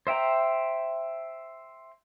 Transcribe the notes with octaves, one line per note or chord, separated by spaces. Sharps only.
C5 E5 G5 A#5